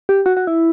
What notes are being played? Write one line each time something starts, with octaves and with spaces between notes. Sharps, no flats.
G4
F#4
F#4
E4